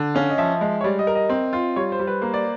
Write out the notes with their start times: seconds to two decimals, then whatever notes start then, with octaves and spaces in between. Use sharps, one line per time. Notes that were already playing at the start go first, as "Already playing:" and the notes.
Already playing: D3
0.15 C#4 F5
0.30 D#5
0.38 F3 E5
0.61 G#3
0.81 C#5
0.84 G3 D5
0.99 D#5
1.07 A#4
1.15 D#5
1.30 C4
1.53 F4
1.76 G3 C#5
1.92 C5
1.99 G3
2.07 B4
2.22 A#3
2.34 D5